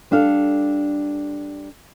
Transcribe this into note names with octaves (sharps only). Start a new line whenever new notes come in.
G3 D4 A4 F5